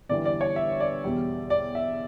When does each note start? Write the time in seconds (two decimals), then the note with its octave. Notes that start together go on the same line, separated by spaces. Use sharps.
0.09 G1 G2 E3 G3 D5
0.25 D5
0.41 C#5
0.56 E5
0.80 D5
1.04 E2 B2 G3
1.50 D5
1.75 E5